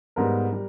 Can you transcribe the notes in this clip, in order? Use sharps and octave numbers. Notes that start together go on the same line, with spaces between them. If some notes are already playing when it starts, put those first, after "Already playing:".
G#2 G3 B3 A#4
G3